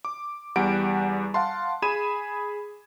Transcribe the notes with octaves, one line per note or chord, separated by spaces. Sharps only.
D6
E2 G3 F#5 D7
F5 F#5 A5 C6
G#4 B5 G#6 D#7 E7